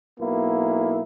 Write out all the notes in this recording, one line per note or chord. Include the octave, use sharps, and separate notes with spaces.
B1 A#3 B3 E4